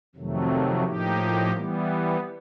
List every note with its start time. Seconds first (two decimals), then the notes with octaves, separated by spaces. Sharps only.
0.15 F2 C3 D#3 F#3 A3
0.84 A2 F3 A#3 D#4 G4
1.52 E3 G3 B3